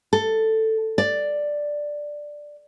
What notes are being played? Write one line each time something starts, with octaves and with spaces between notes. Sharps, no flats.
A4
D5